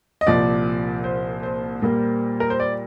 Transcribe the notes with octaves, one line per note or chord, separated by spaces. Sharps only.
D#5
C2 A#2 F3 D5
C5
C5
A#2 G3 A#3
A#4
C5
D5